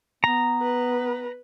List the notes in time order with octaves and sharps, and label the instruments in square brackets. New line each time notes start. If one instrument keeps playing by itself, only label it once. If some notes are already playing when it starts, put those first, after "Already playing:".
[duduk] B3 [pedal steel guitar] A#5
[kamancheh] B4